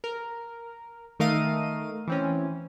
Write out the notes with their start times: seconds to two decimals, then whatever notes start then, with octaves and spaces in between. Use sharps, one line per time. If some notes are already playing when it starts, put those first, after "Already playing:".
0.04 A#4
1.20 D#3 A3 A#4 D#5 F5 D#7
2.07 E3 C4 C#4